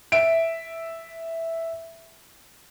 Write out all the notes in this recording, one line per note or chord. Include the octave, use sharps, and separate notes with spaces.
E5 D7